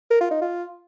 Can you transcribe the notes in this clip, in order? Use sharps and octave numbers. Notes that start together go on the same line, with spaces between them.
A#4
F4
D#4
F4